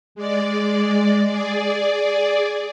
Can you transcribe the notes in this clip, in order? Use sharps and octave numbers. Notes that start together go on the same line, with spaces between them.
G#3 D5
G#4 D5